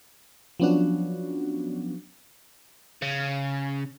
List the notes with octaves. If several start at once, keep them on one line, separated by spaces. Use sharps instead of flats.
F3 F#3 B3 C#4 D4 F#4
C#3